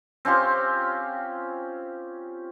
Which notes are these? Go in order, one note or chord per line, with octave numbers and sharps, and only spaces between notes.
C4 C#4 F4 G4